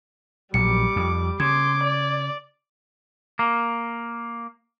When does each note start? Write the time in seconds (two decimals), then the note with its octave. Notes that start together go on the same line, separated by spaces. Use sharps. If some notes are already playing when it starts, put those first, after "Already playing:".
0.54 A#1 F#3 G3 D6 C#7
0.96 F2
1.40 C#3 C6 D6 G#6
1.84 D5
3.39 A#3